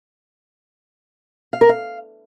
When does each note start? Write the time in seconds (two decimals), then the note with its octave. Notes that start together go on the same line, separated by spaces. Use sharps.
1.53 F5
1.61 A#4
1.69 F5